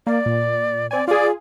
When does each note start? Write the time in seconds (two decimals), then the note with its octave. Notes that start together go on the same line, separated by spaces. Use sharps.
0.07 A#3 D5
0.26 A#2
0.91 C4 D5 G#5
1.08 F4 G#4 D5